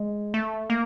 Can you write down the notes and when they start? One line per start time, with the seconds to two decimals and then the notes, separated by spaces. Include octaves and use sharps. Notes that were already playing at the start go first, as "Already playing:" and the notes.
Already playing: G#3
0.34 A3
0.70 A#3